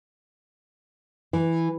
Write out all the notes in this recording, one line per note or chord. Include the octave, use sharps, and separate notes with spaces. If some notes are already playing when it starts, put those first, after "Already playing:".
E3